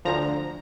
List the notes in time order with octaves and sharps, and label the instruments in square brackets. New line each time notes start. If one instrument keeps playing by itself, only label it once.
[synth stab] D2 D3 F3 A#5